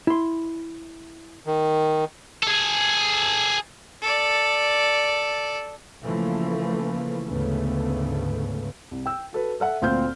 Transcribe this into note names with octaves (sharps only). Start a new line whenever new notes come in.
E4 C6
D#3
G#4 A4
A4 D5
C#3 E3 F3 A3 A#3
D2 G#2 C#3 A3 B3
C2
G5 E6
F#4 A4 B4
A4 E5 F#5
D2 A#2 C4 F5 F6 G6